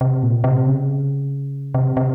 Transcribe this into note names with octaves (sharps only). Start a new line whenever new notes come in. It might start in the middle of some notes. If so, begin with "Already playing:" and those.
C3
A#2
C3
C#3
C3
C3